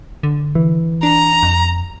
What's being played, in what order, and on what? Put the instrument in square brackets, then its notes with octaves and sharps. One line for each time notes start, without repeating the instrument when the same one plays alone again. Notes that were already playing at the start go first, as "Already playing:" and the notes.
[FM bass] D3
[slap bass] E3
[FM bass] D4 [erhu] A#5
[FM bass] F2